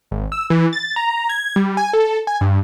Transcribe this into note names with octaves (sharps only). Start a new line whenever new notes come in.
G#1
E6
E3
A6
A#5
G#6
G3
G#5
A4
G#5
G2